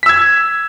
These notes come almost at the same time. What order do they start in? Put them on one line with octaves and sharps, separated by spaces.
B6 E6 G#6